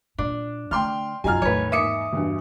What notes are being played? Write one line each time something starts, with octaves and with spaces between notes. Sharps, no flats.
A#2 D4
D3 A3 G5 C6 F6
B1 F#2 F#3 D#4 F4 G#5 A#5 F6
E2 A2 D#3 B4 C#5
G#2 A#3 E5 D6 D#6 C#7
E2 G2 B2